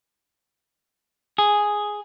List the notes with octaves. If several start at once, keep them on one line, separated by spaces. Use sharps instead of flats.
G#4